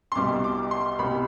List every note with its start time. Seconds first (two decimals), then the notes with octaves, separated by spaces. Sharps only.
0.12 C6
0.15 C2 B2 G3 D6
0.44 D6
0.71 C6
0.99 C2 B2 G3 B5